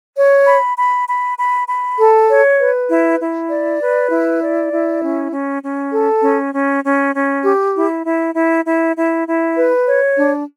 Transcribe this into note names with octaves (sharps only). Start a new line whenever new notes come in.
C#5
B5
B5
B5
B5
B5
A4
C#5
B4
E4
E4
D5
B4
E4
D5
E4
C#4
C#4
C#4
A4
C#4
C#4
C#4
C#4
G4
E4
E4
E4
E4
E4
E4
B4
C#5
D4